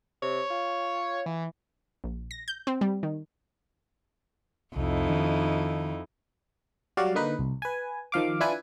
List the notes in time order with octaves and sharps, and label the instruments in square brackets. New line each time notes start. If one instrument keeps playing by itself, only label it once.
[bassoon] C3 [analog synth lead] C#5
[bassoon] F4
[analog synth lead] E3
[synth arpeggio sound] A#1
A#6
G6
C4
G3
D#3
[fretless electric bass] C2 [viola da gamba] F2 D#4 E4
[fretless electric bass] D#3 D4
[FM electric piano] F#3 G3 F#4 D5 F5
D3 A#3 D#4 B4
C2
B4 G#5
D#3 F3 F5 D6
D4 E4 F4 B4 G#5